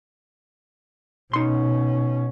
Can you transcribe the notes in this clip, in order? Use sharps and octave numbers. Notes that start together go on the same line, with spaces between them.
B2 C#4 D#4 C6